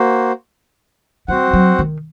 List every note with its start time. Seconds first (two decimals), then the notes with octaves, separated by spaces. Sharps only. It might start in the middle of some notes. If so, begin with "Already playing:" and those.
Already playing: A#3 F#4 C5
1.28 G3 C4 F#4 C5 F#5
1.54 F#3
1.79 D#3